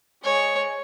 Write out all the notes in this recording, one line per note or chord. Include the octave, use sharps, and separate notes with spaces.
G#3 C#5